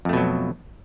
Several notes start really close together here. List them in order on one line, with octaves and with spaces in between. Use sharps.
F2 A3 B2 F#3